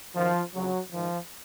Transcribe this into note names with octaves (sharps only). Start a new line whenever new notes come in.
F#2 D#3 F3
F2 C#3 F#3
G#2 D#3 F3